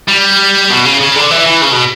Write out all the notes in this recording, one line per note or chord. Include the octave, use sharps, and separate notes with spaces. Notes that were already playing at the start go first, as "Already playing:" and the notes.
G3
B2
C#3
C#3
D3
E3
E3
C#3
B2